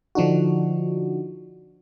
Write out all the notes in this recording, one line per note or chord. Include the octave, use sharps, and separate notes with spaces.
D3 F3 D4 D#4 F#4